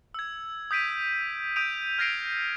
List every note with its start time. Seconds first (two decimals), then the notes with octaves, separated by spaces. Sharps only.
0.14 E6 G#6
0.71 D#6 G6 B6 D7 D#7
1.56 D#6 G6 D7 D#7 F7
1.99 F6 G#6 A#6 C7 D7 F7